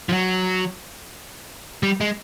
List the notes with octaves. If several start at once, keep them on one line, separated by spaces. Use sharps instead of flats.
F3
F#3
G3
G#3